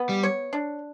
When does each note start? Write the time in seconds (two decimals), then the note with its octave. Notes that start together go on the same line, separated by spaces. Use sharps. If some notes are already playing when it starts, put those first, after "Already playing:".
Already playing: B3
0.09 G3
0.23 C#5
0.53 D4